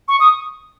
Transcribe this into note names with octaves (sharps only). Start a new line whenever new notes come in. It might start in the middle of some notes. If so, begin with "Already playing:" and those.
C#6
D#6